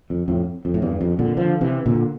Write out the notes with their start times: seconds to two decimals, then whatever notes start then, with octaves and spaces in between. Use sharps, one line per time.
0.10 F2
0.28 F2 A2
0.65 F2
0.74 A2
0.82 E2 G2
1.01 F2
1.19 A#2 D3
1.37 D3 F3
1.61 C3 E3
1.86 A#2 D3